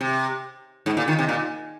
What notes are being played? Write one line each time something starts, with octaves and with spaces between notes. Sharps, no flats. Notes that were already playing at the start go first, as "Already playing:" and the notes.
C3
G#2
A#2
D#3
C3
A#2